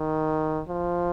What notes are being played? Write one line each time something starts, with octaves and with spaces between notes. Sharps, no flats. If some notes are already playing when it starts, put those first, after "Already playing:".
Already playing: D#3
F3